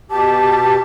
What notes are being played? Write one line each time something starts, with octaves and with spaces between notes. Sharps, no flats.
B2 G4 A5